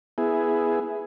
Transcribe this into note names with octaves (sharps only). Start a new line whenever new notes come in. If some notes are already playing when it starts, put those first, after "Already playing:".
B3 E4 G#4